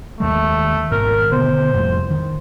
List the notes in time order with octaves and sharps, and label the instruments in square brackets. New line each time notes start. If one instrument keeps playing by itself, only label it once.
[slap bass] D#2 D#3 G#3 [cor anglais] A3
[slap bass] G#1 G#2 B2 [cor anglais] A#4
[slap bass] B2 D3 B3 [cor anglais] C5
[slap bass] F2 A2 C3
D#3